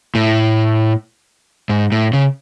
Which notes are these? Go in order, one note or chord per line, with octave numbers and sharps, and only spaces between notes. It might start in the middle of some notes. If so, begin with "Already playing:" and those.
A2
G#2
A2
C#3